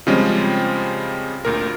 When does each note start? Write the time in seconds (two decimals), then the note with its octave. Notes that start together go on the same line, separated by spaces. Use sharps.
0.07 C#3 F3 G3 G#3 C4 C#4
1.45 D2 A#2 A#4